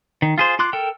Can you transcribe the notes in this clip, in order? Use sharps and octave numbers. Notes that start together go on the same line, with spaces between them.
D#3
F4 G#4 C5
F4 C6 D6 F#6
A4 A#4 G5